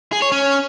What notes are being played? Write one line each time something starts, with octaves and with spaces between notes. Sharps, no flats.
G#4
C#5
C#4